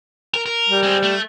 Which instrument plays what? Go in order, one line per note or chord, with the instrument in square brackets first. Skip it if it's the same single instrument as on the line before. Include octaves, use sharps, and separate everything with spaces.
[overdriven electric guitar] A#4
A#4
[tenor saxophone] G3
[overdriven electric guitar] G#3 C4
A3